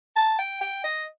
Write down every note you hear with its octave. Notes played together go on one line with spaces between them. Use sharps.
A5
G5
G5
D#5